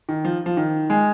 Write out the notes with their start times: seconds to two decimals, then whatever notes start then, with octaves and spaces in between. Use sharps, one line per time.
0.09 D#3
0.25 F3
0.46 F3
0.57 D#3
0.90 G#3